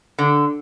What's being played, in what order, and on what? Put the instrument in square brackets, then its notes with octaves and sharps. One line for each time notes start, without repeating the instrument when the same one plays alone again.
[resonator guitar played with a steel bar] D3